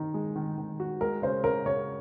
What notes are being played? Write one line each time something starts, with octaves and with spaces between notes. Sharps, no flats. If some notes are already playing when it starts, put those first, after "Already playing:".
Already playing: D#3 D#4
G#3
D#3
D#3
F#4
G#3 A#4
C#3 C5
C#3 A#4
C#3 C#5